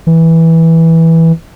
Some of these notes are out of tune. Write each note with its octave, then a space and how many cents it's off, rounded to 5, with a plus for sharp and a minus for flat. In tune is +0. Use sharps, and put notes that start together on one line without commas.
E3 -10